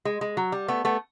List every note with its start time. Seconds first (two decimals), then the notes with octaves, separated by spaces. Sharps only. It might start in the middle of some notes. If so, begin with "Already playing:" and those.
0.05 G#3
0.21 G#3
0.37 F#3
0.52 G3
0.68 A3 B3
0.85 A3 B3